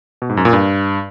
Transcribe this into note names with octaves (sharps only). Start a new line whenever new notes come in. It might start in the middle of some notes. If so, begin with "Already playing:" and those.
B2
G#2
F#2
A#2
G2